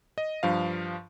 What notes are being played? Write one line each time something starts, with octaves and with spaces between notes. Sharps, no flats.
D#5
G2 F3 F5